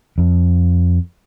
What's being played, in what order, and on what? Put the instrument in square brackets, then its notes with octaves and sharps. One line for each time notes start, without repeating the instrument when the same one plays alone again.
[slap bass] F2